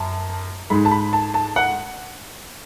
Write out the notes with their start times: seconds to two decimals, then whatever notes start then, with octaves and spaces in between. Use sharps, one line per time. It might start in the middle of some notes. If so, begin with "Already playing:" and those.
Already playing: F#2 A5
0.70 G#2 G#3 B5
0.85 A5
0.91 B5
1.13 A5
1.34 A5
1.56 F#5